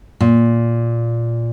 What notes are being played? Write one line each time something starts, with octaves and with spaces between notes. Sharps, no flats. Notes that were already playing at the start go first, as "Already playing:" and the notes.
A#2